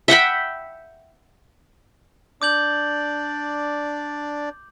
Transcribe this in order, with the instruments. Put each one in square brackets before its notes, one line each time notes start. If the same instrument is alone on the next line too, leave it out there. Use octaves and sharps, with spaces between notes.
[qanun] E5 F#5 G5 B5
[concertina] D4 D5 [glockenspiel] D6 G6 F#7